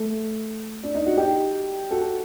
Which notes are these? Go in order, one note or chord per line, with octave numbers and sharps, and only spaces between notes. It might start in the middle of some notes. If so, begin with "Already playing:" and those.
Already playing: A3
D4
D#4
F#4
D#4 G4
F#4 A4